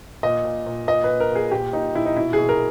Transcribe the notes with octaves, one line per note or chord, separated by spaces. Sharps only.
A#2 D#5
A#2
A#2
A#2 D#5
B4
A#2
A#4
A#2 G#4
A#2 G4
A#2 D#4
A#2 E4
D#4
B2 E4
G#4
B2
A#4